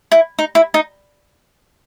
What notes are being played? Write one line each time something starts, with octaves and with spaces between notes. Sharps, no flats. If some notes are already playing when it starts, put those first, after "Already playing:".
E4
D#4
E4
D#4